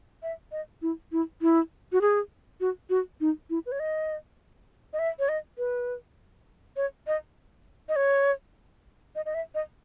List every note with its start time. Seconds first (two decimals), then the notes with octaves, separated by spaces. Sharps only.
0.23 E5
0.52 D#5
0.82 E4
1.12 E4
1.42 E4
1.92 F#4
2.01 G#4
2.61 F#4
2.90 F#4
3.21 D#4
3.50 E4
3.66 B4
3.72 C#5
3.80 D#5
4.93 D#5
4.99 E5
5.19 C#5
5.29 D#5
5.58 B4
6.76 C#5
7.07 D#5
7.89 D#5
7.96 C#5
9.15 D#5
9.26 D#5
9.35 E5
9.55 D#5